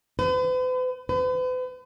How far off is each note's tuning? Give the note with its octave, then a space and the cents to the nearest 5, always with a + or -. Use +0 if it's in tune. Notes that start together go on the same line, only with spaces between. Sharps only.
B4 +45
B4 +45